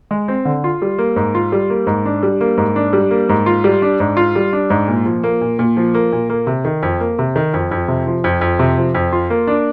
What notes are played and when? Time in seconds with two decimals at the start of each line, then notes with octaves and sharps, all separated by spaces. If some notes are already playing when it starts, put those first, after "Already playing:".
0.11 G#3
0.28 C4
0.45 D3
0.64 F4
0.82 G3
0.98 A#3
1.16 G#2
1.35 F4
1.52 G3
1.70 A#3
1.87 G#2
2.05 D4
2.23 G3
2.41 A#3
2.57 G#2
2.76 D4
2.93 G3
3.11 A#3
3.29 G#2
3.46 F4
3.64 G3
3.82 D4
4.00 G#2
4.17 F4
4.36 G3
4.53 D4
4.70 G#2
4.88 A#2
5.06 F3
5.24 A#3
5.41 A#2
5.59 A#2
5.77 F3
5.94 A#3
6.12 A#2
6.30 A#3
6.47 C3
6.65 D#3
6.83 F2
7.00 A#3
7.19 C3
7.36 D#3
7.54 F2
7.71 F2
7.88 C3
8.07 F3
8.24 F2
8.41 F2
8.59 C3
8.78 F3
8.95 F2
9.13 F4
9.30 A#3
9.47 D4